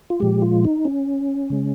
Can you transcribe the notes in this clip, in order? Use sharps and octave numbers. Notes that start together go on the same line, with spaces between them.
F4
A#2 F3 G#3 G4
F4
D#4
C#4
C#3 G#3